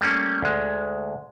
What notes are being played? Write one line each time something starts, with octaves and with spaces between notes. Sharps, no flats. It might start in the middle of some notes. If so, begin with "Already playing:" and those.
G3 A3 A#3 C#4
D2 G#3